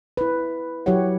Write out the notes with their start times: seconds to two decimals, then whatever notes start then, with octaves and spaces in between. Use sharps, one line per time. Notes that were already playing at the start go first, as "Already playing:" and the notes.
0.17 E4 B4
0.86 F#3 E4 G4 C#5 F#5